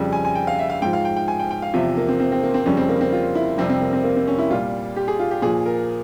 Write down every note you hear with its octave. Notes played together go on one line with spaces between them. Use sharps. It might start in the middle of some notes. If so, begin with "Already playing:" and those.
Already playing: F2 C#3 G3
G#5
G#5
G5
F5
E5
F5
G#2 F3 G5
F5
G5
G5
G#5
G5
G5
F5
E2 C3 F3 E5
A#3
C4
C4
C4
A#3
C4
F2 C#3 G3 C#4
C4
A#3
C4
F4
E4
F2 C3 G3 C4
C4
A#3
C4
A#3
C4
C#4
E4
A#2 G3 F4
G4
G#4
F4
G4
A#2 F3 G#4
A#4